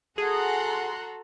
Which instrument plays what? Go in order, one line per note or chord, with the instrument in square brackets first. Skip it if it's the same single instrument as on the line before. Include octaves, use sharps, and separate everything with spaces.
[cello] F#4 A4 [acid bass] G#4 [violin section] F#5 A#5 C6